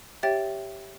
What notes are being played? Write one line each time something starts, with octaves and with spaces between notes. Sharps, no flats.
G4 C#5 E5 G5 A6